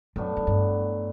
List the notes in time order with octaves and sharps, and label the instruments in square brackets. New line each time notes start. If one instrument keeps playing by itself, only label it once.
[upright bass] F#2 [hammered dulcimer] A2 F#3 B3 D4
[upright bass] F#2
G2